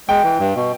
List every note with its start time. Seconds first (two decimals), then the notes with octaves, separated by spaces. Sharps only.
0.08 G#3 G5
0.24 E3
0.39 G2
0.55 B2